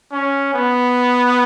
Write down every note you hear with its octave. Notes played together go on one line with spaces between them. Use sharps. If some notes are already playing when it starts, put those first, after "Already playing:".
C#4
B3